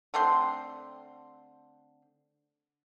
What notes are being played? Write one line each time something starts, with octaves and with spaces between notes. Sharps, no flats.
D3 A3 C4 C6